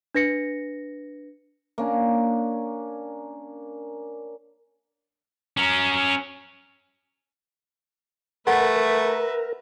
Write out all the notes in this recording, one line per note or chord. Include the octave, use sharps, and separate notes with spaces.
D4 B4 A#6 C#7
A#3 C#4 D4
C#4 A#4
A3 A#4 B4 E5 F#5